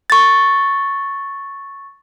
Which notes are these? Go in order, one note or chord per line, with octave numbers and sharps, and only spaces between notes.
C#6 A6